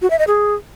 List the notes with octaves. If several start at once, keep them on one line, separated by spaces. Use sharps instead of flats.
F#4
E5
D#5
G#4